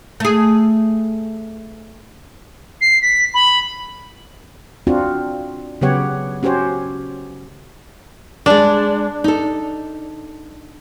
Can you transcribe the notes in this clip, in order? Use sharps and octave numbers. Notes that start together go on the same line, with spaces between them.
A3 G#4
C7
B6
B5
C4 D4 F4 F#4
C#3 F#3 B3 G4 C#5 F#5
C#4 F#4 G4 C5 C#5
G#3 D4 D5
D#4 A4